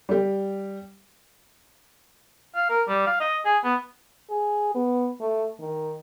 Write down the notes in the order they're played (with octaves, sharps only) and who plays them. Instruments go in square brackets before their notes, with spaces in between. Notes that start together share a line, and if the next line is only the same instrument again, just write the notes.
[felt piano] G3 G4
[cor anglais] F5
A#4
G3
F5
D#5
G#4
B3
[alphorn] G#4
B3
A3
D#3